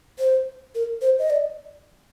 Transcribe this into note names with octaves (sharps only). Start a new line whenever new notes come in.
C5
A#4
C5
D#5
D5